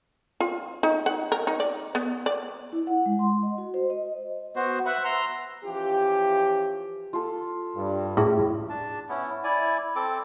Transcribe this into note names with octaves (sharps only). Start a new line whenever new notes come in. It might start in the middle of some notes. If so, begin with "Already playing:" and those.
F4
D#4
F#5
A#4
D#4
D5
B3
D5
E4
F#5
G#3
C6
D#5
F#4
C5
D#5
B3 F#4 C5
B4 E5 F#5 B5
A#5 C6 E6
E3 F3 C#4 G4
F4 A4
G2
A2 C#4 E4 G#4
D4 A5
B3 C#4 E4
E4 D5 G#5
C4 A4 D6